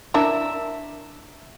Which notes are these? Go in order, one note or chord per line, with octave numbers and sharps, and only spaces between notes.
D4 E4 A#4 E5